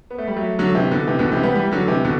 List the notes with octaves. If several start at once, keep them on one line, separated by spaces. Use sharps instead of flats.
B3
A3
G3
F#3 A3
D3 F#3
C3 E3
B2 D3
C3 E3
B2 D3
C3 E3
G3 B3
E3 G3
D3 F#3
C3 E3
B2 D3